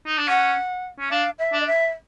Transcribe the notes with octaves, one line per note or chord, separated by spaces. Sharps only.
D#4
D4
C#4 F#5
C#4
D4 F5
E5
D4
D#5
E5